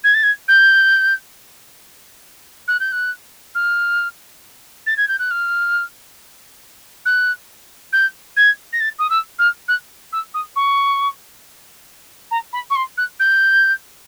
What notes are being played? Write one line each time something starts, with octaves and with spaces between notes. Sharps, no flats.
G#6
A6
G#6
G6
F#6
G6
F#6
F6
A6
G#6
G6
F#6
F6
F#6
G6
G#6
A#6
A6
D#6
E6
F6
F#6
E6
D#6
C#6
A#5
B5
C#6
C6
F#6
G6